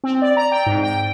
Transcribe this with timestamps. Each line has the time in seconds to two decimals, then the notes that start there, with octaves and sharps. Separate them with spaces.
0.04 C4
0.22 D5
0.37 A#5
0.52 G5
0.66 G#2
0.83 G5